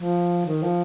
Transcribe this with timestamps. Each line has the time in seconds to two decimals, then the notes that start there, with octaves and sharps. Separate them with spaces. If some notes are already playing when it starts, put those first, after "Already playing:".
Already playing: F3
0.45 D#3
0.63 F3